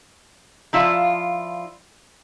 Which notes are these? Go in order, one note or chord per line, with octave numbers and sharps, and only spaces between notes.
F3 E4 F4 D5